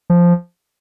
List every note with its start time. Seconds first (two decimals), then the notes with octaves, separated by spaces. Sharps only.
0.10 F3